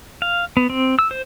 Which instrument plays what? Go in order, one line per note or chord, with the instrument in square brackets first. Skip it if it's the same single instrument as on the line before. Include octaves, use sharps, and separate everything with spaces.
[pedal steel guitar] F5
B3
C4
E6
C5